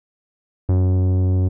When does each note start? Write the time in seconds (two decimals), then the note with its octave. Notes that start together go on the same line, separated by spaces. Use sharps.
0.69 F#2